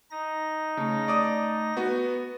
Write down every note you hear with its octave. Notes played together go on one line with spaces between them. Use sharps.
D#4 A#6
C#3 A3
D5 D6 D#6
B3 F#4 B4